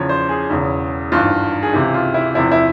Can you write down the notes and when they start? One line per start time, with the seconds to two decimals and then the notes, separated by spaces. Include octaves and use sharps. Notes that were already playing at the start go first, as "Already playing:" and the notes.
Already playing: E2 C#3 F3 C#5
0.09 C5
0.29 G#4
0.50 E1 E2 C#3
1.12 G#1 G2 E3 F4
1.63 G#4
1.73 C#2 C3 E3 G4
1.94 F4
2.14 E4
2.35 E2 C3 F3 E4
2.52 E4